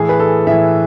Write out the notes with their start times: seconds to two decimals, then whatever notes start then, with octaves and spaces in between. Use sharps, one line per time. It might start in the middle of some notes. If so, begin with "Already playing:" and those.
Already playing: A2 E3 G#4
0.09 B4
0.19 A4
0.47 A2 E3 E5